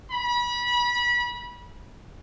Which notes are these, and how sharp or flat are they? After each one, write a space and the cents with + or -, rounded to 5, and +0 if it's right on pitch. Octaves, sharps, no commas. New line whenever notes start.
B5 -30